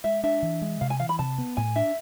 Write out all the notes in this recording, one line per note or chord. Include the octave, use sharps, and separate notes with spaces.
G#3 E5
D4 E5
E3
G#3
C3 F5
G#5
E3 F5
B5
C3 A5
B3
A2 G#5
D4 E5